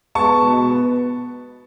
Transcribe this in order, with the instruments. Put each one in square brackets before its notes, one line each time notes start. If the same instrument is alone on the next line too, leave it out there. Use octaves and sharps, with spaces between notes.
[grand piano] G#3 B3 A5 C#6
B2
B3